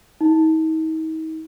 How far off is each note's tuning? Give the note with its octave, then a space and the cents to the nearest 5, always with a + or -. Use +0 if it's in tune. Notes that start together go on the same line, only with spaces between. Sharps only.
D#4 +40